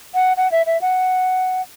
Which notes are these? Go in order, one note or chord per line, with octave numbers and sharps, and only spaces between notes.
F#5
F#5
E5
E5
F#5